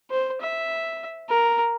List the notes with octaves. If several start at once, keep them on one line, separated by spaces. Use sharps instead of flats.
C5
E5
A#4